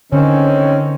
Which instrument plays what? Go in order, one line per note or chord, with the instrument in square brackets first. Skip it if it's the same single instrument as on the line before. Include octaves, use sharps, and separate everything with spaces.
[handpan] D3 [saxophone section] D#3 C4 C#4